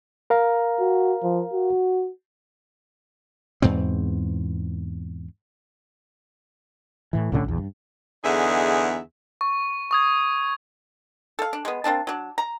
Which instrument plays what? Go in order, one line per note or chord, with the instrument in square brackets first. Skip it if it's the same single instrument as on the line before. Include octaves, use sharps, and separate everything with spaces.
[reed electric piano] A#4 F5 A#5
[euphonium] F#4
F3
F#4
[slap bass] E2 G#2 B2 C4
[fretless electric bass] A2 E3
C2 A2 D3 C#4
A#1 E2
G2
[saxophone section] E2 D3 D#4 G#4 E5
[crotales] C#6
C#6 D#6 G#6
[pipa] A4 F5
D4
G#3 B3
A#3 C4 D4 A5
F#3 D4
A#5